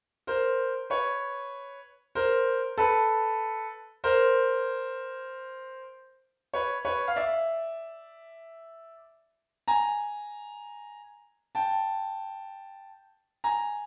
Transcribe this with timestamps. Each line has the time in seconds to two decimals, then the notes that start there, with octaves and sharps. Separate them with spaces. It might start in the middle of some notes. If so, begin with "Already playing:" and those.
0.27 A#4 C5
0.90 B4 C#5
2.15 A#4 C5
2.78 A4 B4
4.04 A#4 C5
6.54 B4 C#5
6.85 B4 C#5
7.08 F5
7.16 D5 E5
9.68 G#5 A#5
11.55 G5 A5
13.44 G#5 A#5